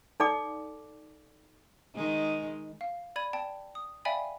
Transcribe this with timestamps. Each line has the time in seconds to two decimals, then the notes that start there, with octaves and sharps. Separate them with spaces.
0.20 D#4 A4 D5 G5 D6
1.95 D#3 G#3
2.81 F5
3.16 D5 B5 G#6 D#7
3.33 D5 G5 A5
3.75 D#6
4.05 D5 E5 F5 G5 G#5 B5